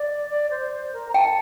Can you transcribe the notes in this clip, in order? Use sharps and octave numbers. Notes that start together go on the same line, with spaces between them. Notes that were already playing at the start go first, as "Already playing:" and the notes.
Already playing: D5
D5
C5
C5
A#4
A#5
G5 A5